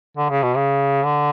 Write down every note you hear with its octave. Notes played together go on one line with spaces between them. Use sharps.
D3
C#3
B2
C#3
D3